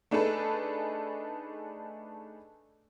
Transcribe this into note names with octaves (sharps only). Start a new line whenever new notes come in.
A3 D4 D#4 G#4 A4 B4